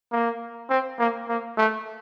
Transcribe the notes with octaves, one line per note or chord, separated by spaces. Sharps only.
A#3
C4
A#3
A#3
A3